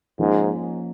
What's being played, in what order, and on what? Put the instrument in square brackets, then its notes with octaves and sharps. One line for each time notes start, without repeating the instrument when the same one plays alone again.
[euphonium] G#2 [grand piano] F3 A#3 C#4